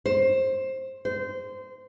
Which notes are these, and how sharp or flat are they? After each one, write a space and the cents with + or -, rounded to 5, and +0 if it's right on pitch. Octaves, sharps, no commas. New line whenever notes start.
C5 +15
C5 -20